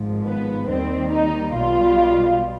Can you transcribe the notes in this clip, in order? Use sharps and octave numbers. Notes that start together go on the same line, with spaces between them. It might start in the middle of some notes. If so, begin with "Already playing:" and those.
Already playing: G#1 G#2 F3
B3
D#2 D#3 G3 C4
D#4
B1 B2 G3 F4